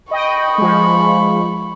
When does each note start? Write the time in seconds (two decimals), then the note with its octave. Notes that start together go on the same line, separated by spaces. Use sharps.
0.11 D#5 G5 B5 C#6
0.58 F3 G#3